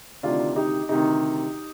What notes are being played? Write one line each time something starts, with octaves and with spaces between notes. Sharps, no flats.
D2 C3 D#3 D4 F4
D#4 G4
D2 C3 D#3 D#4 G4